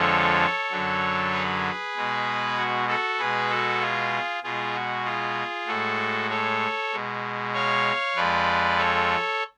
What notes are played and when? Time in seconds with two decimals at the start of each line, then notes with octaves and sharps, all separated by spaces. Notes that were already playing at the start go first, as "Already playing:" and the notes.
Already playing: F2 D3 F3 G#3 A4 C#5
0.71 F#2 D3 F#3
1.32 G#4 B4
1.95 B2 G#3
2.57 F#4
2.87 F#4 A4
3.19 B2 G#3 G#4 B4
3.50 F#4 A4
3.81 F4 G#4
4.43 B2 G#3 F4 G#4
4.75 F#4
5.05 F4 G#4
5.67 A2 G#3 F#4 A4
6.30 A4 C#5
6.93 B2 G#3
7.54 C#5 F5
8.16 F2 F3 G#3 B4 D5
8.78 A4 C#5